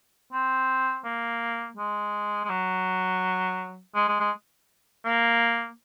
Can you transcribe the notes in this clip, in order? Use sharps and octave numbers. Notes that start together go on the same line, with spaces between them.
C4
A#3
G#3
G#3
F#3
G#3
G#3
G#3
A#3